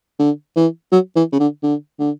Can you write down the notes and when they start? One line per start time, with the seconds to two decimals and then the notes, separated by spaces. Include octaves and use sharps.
0.19 D3
0.56 E3
0.92 F#3
1.16 E3
1.32 C#3
1.40 D3
1.63 D3
1.99 D3